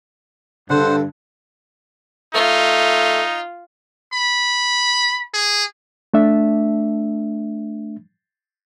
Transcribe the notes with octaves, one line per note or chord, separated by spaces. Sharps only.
G2 D3 A4 C5 F#5
A3 D#4 F4
B5
G#4
A3 D4 E5